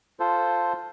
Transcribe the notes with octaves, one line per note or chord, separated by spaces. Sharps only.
F4 A4 C5